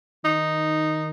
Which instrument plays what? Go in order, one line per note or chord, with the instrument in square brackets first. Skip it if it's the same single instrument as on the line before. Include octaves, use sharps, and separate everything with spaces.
[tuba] D#3 [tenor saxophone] D#4